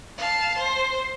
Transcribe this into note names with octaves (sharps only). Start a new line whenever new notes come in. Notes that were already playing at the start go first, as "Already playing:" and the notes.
F5 A5
C5